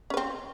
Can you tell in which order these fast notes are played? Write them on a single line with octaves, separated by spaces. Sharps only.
C#4 B4 C4